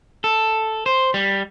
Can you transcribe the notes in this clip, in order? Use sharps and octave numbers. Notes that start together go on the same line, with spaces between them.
A4
C5
G3